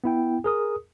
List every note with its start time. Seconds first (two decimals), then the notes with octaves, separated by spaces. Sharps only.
0.04 B3 E4 G5
0.44 G#4 A#4 D#6